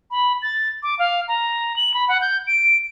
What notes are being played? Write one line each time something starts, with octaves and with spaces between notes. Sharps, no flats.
B5
A6
D6
F5
A#5
F#7
B5
F#5
G6
D7